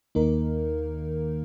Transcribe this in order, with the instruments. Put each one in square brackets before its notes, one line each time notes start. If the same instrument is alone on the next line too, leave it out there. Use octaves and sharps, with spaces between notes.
[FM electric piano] D#2 D#3 A#3 D#4 A#4